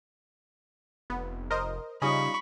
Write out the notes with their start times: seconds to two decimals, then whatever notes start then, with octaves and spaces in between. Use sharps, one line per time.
1.10 F1 B3
1.51 A#4 C5 D#5
2.02 C#3 G3 C#4 D#4 F4 D#5 B5 C#6